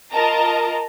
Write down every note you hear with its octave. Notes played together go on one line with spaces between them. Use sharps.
F4 A#4 D#5 A5 A#5